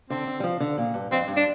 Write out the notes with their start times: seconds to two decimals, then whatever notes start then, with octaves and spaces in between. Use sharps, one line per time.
0.10 D3 C4
0.27 D3
0.40 G3
0.44 F3
0.60 D3
0.78 A#2
0.94 G2
1.11 F2 C4
1.28 G2
1.37 D4